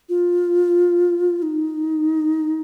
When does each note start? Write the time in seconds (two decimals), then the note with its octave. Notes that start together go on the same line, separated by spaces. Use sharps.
0.09 F4
1.42 D#4